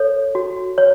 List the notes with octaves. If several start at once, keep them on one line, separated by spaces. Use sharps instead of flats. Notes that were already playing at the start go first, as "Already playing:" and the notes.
Already playing: A4 C#5
F#4
C#5